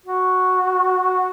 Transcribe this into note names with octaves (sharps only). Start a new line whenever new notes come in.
F#4